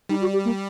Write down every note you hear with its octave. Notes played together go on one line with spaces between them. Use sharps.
G3 D#4
F#4
G4
A#3